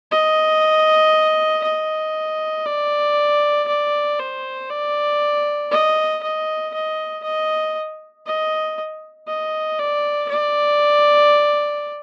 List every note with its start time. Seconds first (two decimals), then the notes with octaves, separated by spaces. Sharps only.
0.11 D#5
1.64 D#5
2.66 D5
3.68 D5
4.19 C5
4.70 D5
5.71 D#5
6.23 D#5
6.74 D#5
7.24 D#5
8.26 D#5
9.28 D#5
9.79 D5
10.29 D5